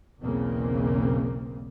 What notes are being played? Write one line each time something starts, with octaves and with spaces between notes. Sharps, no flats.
B1 E2 C#3 A#3 C4